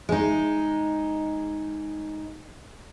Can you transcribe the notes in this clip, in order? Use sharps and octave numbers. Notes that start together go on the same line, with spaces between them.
G#3 D#4